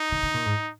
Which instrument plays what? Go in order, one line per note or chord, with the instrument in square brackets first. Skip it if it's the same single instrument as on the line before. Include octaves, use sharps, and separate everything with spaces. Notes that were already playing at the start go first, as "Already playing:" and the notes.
Already playing: [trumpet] D#4
[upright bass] D3
D3
A#2
G#2